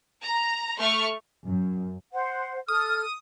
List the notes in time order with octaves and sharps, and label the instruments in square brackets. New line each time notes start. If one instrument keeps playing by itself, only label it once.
[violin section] A#5
A3 C#6 F6
[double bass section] F#2
[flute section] C5 F#5
[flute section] A4 F6 [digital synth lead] D#6